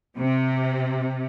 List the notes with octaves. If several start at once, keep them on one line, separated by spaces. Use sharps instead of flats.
C3